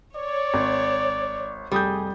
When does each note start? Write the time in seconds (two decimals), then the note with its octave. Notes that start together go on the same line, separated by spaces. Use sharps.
0.16 C#5 D5
0.54 G#1
1.72 F1 G3 G#4 D#6 G6